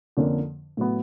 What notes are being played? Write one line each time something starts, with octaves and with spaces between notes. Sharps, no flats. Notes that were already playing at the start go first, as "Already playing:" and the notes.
F2 D3 F3 A#3 C#4
A2 F#3 B3